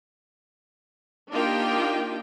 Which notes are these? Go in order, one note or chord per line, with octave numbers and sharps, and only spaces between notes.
A#3 D4 D#4 F4 G4 G5